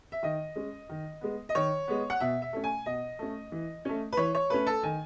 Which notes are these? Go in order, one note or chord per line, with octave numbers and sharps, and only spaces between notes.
E5
D#3 D#5
G#3 C#4
D#3
G#3 B3
D#5
D#3 C#5
G#3 B3
F#5
B2 E5
E5
A3 C#4
G#5
B2 D#5
A3 C#4
E3
A3 C#4
B4
E3 C#5
C#5
A3 C#4 B4
A4
D#3 G#5